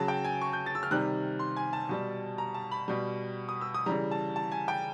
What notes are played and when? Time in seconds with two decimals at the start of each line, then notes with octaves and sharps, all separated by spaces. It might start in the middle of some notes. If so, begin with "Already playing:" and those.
Already playing: C#3 F#3 A5
0.08 G5
0.24 G#5
0.42 C#6
0.53 G6
0.66 A6
0.75 E6
0.83 F6
0.91 C3 D#3 G3 F#6
1.39 C6
1.57 G#5
1.73 A5
1.89 B2 G3
2.38 A#5
2.54 A5
2.71 B5
2.88 B2 G3
3.49 D#6
3.61 E6
3.74 D#6
3.86 C#3 E3 G3 A#5
4.11 A5
4.36 A5
4.52 G#5
4.68 G5